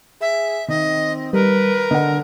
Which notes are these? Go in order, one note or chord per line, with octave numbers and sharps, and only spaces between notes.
G#4 E5
D#3 C4 D#5
G3 A#4 B4
D3 D#5 F#5